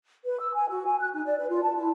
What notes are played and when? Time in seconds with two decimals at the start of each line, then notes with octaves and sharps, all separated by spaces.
0.25 B4
0.40 E6
0.54 G#5
0.69 F#4
0.86 G#5
0.99 F#6
1.13 D#4
1.25 D5
1.37 B4
1.48 F4
1.63 A5
1.75 E4